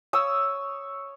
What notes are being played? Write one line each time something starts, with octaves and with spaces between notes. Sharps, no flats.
C#5 D#6 E6